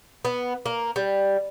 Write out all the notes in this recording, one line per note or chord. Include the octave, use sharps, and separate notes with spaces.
B3
A#3
G3